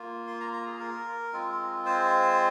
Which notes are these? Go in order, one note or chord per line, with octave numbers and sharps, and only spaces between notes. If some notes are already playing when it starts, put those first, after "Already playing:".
Already playing: A#3 F4
C6
A#5
A#5
G#4
A#4
G#3 C4 F4
C5